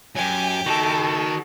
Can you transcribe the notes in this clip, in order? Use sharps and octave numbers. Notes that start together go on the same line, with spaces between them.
F#2 F#3 G4 G#5 D6
D#3 F#4 A4 A5